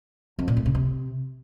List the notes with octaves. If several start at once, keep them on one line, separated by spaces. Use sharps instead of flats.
F2
A#2
A3
C#3
C3